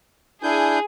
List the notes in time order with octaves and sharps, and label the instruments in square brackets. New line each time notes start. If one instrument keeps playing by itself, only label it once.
[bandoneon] D4 E4 G6 [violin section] G#4